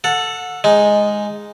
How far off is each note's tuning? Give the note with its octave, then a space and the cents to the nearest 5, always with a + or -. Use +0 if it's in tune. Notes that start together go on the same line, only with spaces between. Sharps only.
A4 +10 F#5 -25
G#3 +0 D#4 +0